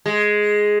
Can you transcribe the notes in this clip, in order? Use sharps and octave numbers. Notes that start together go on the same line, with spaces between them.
G#3